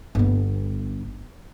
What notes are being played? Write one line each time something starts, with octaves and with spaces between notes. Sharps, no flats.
G1 B3